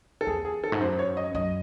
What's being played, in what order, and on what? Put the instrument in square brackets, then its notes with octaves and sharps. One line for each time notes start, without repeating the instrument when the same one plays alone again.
[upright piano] A4
[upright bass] E2 [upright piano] G#4
[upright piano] G#4
A4
[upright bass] G#2
[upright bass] F#2 [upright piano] C5
[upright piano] C#5
D#5
[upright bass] F#2 [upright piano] D#5